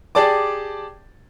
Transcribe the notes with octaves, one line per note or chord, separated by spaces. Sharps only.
G4 G#4 D5 A5 D6